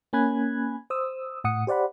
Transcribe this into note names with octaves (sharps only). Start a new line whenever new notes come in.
A#3 C#4 G#5 B5 F#6 G#6
C5 D#6 E6
A2 F#5 D#6 C#7
G4 C5 D5 F#5 B5